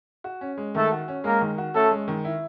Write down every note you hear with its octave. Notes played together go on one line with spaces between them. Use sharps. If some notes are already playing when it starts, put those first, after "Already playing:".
F#4
C#4
G#3
D#3 A3 A4
F#4
C#4
G#3 A#3 A#4
D#3
F#4
A3 C#4 A4
G#3
D#3
E4